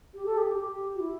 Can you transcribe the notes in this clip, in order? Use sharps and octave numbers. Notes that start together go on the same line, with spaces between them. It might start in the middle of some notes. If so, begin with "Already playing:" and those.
G4
A4
G4
G4
F#4
E4